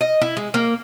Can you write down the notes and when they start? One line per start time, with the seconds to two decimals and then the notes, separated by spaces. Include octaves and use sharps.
0.01 D#5
0.21 E4
0.37 G#3
0.54 A#3